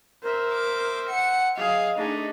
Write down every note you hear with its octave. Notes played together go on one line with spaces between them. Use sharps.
A#4 C5 E5
D6
F#5 C#7
F#3 G#4 D#5 F5
A3 D4 D#4 G#4